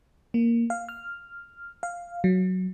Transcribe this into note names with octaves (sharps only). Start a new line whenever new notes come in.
A#3
F5
F6
F5
F#3